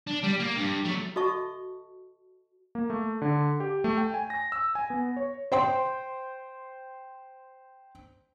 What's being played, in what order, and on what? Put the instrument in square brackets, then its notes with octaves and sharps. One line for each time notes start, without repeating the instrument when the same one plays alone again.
[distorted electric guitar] D4
G3
A#3
G2
F#3 A3
[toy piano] F#4 A4 D#5 E5 A5 C#6
[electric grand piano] A#3
A3
D3
G4
A3
G5
G#5
A#6
E6
G#5
B3
C#5
[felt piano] C5 G5 C6